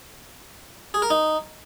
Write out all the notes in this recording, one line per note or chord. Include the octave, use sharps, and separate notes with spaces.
G#4
A#4
D#4